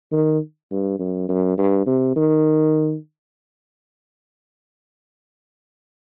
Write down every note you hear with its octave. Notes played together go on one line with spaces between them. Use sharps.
D#3
G2
F#2
F#2
G2
C3
D#3